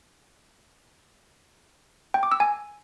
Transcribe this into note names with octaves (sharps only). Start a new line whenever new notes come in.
G5
D6
E6
G#5